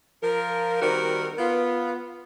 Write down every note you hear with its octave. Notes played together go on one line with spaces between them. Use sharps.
F3 A#4
D#3 G3 C4 F#4 A#4
B3 F4